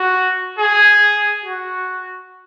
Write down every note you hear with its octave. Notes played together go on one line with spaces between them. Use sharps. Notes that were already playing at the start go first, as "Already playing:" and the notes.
Already playing: F#4
G#4
F#4